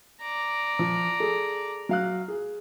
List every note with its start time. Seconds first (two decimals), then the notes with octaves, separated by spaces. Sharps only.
0.22 D5 A#5
0.79 F3
1.20 G#4 A4
1.89 F#3 F5 F#6
2.28 G#4